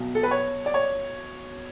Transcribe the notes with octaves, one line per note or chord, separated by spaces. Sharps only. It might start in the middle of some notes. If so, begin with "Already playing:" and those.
Already playing: B1 B2
A4
B4
C#5
D5
C#5